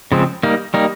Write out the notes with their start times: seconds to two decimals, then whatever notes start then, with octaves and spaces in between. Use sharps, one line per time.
0.12 C#3 F3 G#3 C4
0.43 G3 A#3 D#4
0.74 G3 A#3 D#4